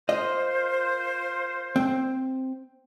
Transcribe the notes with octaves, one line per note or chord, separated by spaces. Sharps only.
F4 A#4 C5 D#5
C4